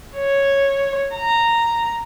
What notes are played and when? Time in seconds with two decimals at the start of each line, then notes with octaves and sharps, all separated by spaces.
0.16 C#5
1.14 A#5